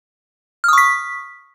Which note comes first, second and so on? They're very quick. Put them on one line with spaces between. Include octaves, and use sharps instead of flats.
F6 D#6 C#6 B6